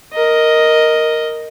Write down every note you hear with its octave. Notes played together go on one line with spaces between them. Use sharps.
A#4 D#5